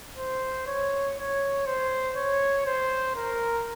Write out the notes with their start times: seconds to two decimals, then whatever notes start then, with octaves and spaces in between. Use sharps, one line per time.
0.17 C5
0.67 C#5
1.17 C#5
1.66 C5
2.16 C#5
2.66 C5
3.16 A#4